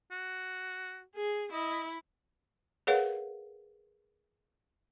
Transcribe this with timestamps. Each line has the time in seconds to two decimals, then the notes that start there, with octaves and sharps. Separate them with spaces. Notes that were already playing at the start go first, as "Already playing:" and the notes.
0.11 F#4
1.16 G#4
1.52 E4 D#5
2.87 G#4 A#4 B4 C#5 F5 F#5